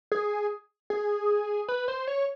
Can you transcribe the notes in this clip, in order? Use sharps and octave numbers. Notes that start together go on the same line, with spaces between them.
G#4
G#4
B4
C5
C#5